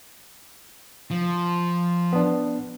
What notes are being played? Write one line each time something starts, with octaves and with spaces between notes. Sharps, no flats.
F3
B3 D4